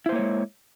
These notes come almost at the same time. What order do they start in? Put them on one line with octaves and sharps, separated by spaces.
E4 C5 A#3 C#5 G#3